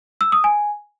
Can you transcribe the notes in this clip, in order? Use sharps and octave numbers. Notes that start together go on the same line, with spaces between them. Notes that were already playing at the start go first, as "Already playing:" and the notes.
E6
D#6
G#5